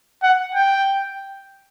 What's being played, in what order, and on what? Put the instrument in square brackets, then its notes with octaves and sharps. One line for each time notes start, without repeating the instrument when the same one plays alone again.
[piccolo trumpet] F#5
G5